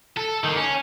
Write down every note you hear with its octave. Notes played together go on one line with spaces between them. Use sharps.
A4
D#3 A#3
C#4